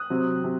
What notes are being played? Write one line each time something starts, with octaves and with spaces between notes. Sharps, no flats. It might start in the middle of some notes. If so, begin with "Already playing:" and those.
Already playing: D#6 F#6
C3 F#3 C4
C3